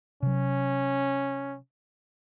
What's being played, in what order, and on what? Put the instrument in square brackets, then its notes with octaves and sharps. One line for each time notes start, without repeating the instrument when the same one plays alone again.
[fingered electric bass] C3 F#3 [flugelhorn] C#4